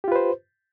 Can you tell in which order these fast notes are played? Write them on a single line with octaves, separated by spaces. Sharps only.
G4 F4 B4 C5